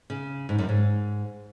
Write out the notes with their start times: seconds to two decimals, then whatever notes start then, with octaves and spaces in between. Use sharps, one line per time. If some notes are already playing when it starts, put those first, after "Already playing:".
0.10 C#3
0.49 G#2
0.58 F#2
0.69 G#2